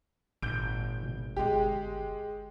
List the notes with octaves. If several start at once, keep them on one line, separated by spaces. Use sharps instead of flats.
G#1 A#2 G6 D7
B2
G1 G#3 G4